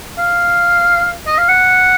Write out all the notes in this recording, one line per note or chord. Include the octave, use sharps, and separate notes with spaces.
F5
D#5
F5
F#5